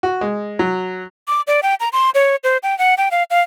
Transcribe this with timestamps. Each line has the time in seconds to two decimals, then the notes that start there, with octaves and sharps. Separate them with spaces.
0.03 F#4
0.21 G#3
0.59 F#3
1.28 D6
1.47 D5
1.63 G5
1.80 A#5
1.93 C6
2.15 C#5
2.44 C5
2.63 G5
2.79 F#5
2.98 G5
3.11 F5
3.31 F5